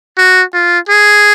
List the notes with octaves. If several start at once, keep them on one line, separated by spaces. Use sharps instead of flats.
F#4
F4
G#4